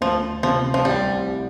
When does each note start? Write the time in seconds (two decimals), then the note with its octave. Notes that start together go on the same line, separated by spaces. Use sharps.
0.01 D2 F3
0.43 C3 F3
0.74 F3
0.85 C2 G3